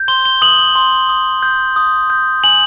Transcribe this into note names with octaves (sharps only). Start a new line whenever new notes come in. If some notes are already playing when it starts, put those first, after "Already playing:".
Already playing: G6
C6 G7
G7
D#6 F#7
C6
D#6
G6
D#6
G6
G#5 F#7